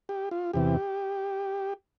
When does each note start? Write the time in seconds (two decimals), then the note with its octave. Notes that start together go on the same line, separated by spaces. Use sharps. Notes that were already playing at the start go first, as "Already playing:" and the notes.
0.09 G4
0.31 F4
0.53 E2 C3 E3 G4